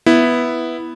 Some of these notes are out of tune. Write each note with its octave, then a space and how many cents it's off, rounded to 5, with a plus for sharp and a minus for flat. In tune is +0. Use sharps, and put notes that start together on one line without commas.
B3 +0 E4 +0